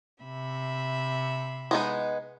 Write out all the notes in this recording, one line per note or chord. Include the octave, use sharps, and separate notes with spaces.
C3 E5 B5
G#3 B3 D#4